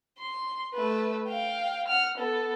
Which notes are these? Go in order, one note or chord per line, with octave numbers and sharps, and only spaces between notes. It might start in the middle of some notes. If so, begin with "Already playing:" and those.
C6
A3 B4
F5 G5
F#5 F6
B3 A4